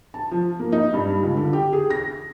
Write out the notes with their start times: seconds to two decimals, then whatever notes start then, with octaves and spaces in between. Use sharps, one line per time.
0.14 A5
0.31 F3
0.60 A#3
0.72 D#4
0.94 G2
1.23 C#2
1.37 D3
1.53 G4
1.73 G#4
1.90 A#6